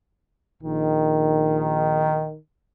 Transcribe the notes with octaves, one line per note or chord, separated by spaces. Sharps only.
A#1 D#3